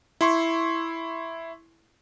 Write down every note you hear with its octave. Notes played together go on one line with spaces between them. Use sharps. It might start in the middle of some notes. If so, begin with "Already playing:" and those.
E4 C6 C#6